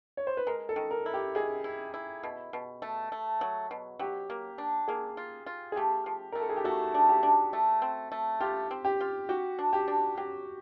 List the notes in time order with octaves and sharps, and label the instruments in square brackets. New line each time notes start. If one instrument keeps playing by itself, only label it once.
[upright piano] C#5
C5
B4
[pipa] G#3 [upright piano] A#4
[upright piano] A4
[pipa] D#3
[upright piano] A#4
[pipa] E4
[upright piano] G4
[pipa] D#3 [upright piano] G#4
[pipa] E4
E4
B2
B2
A3
A3
F#3
B2
[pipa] F#3 [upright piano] G4
[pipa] A#3
D4
[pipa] A#3 [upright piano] G#4
[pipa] F4
F4
[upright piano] G#4
[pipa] A3 [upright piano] G4
[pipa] F3
[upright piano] A#4
[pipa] A3
[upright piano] A4
G#4
G4
[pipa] A3 [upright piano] F#4
[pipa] D4
[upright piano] G4
[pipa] D4
A3
C4
A3
[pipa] F4 [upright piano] G4
[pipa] C4
[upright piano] G4
[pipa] F4
[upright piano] F#4 [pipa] G4
[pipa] D4
[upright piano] G4
[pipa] D4
[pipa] F#3 [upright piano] G4